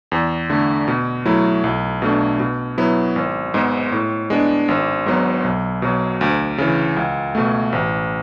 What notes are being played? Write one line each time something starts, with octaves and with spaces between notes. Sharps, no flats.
E2
D3 A3
B2
F#3 A3 E4
B1
B2 A3 D4
B2
F#3 B3 E4
G#1
G#2 G#3 B3
A2
G#3 B3 D4
G#1
G#2 F#3 B3
B1
B2 F#3
D2
C#3 E3
C#2
B2 A3
A1